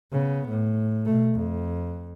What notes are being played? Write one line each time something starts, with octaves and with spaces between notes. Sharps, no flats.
C#3 B3
A2
B2 A3
F2